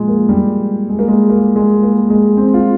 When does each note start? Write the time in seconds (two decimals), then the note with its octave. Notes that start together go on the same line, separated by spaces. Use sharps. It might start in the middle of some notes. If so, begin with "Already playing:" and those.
Already playing: A#2 F3 G#3
0.08 A#3
0.29 G3
0.89 G#3
0.99 A#3
1.08 G#3
1.30 A#3
1.56 G#3
1.83 A#3
2.10 G#3
2.37 C4
2.54 F4